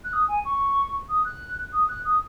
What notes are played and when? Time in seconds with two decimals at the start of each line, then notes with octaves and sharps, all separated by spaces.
0.04 F#6
0.13 D#6
0.28 G#5
0.45 C#6
1.09 D#6
1.25 F#6
1.73 D#6
1.89 F#6
2.05 D#6